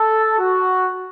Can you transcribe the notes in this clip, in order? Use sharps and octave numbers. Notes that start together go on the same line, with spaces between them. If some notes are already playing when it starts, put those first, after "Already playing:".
Already playing: A4
F#4